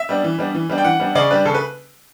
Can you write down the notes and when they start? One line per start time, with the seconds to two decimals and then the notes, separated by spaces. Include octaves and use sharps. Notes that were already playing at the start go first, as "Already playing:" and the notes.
Already playing: E5
0.09 G3 B3 D4
0.24 E3
0.39 G3 B3 D4
0.55 E3
0.70 G3 B3 D4
0.78 G5
0.84 E3 F#5
1.00 G3 B3 D4
1.15 C#3 D5
1.31 G3 D4 B4
1.45 C#3 A4
1.54 B4